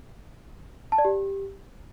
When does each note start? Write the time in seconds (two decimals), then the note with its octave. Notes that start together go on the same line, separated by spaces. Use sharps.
0.92 A5
0.98 D5
1.05 G4